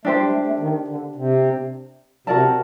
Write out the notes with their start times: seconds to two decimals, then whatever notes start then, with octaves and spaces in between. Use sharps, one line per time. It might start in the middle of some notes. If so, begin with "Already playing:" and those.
0.05 A3 D4 G4 C5
0.19 G3
0.32 A3
0.46 A3
0.60 D#3
0.88 D3
1.16 C3
2.27 C3 F#4 A#4 D5 A5